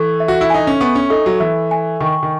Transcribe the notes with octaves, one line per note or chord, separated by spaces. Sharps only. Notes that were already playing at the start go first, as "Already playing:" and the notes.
Already playing: E3 A4 C#6
E5
F#4
E4
D#4 G#5
C#4
B3 C#6
C#4
D#4 A4
F#3
E3 E5
G#5
D#3 C#6
D#3